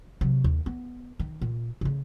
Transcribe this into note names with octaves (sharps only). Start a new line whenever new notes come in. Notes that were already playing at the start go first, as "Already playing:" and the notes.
C3 F#3
D#2
B3
D#3
A#2
C#3 A3